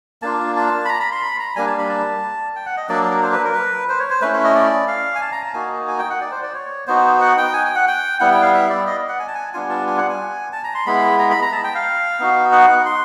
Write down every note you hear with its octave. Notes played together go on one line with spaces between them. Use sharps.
A#3 D4 F4 A5
A5
B5
A#5
B5
C6
B5
A#5
G3 A#3 D4 G#5
A5
B5
A5
G5
F#5
D#5
F#3 A#3 D4 D5
A#4
C5
B4
A#4
B4
C5
C#5
C5
A3 C#4 E4 B4
E5
D#5
D5
F5
G#5
A5
A#5
A5
A#3 D#4 F#4 G#5
G#5
G5
F#5
D5
C5
D5
C#5
B3 D#4 F#4 C5
F#5
G5
G#5
G5
F#5
G5
G3 B3 E4 F#5
G5
F5
E5
D5
D#5
F#5
G#5
A5
G#5
G3 B3 D4 F4 G#5
A5
G#5
F#5
G#5
A5
A#5
C6
G#3 B3 E4 B5
A#5
B5
A#5
A5
G5
F5
B3 D#4 F#4
F#5
C6